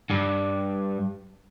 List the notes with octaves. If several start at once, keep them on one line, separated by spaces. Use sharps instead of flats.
G2